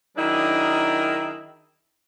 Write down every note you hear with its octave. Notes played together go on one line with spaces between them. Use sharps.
D#3 F#3 D4 E4 G#4 A#4